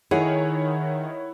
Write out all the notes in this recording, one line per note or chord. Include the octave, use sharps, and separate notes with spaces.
D#3 E4 G#4 C#5 F#5